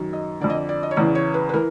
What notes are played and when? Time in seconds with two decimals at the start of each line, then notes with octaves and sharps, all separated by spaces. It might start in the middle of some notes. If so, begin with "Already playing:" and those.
Already playing: F#2 D#3
0.13 D#5
0.40 F2 D3 D5
0.50 D#5
0.55 D5
0.69 D5
0.83 D#5
0.91 C#5
0.96 E2 C#3 E3 D5
1.15 C#5
1.34 B4
1.49 B4
1.54 E3 A#4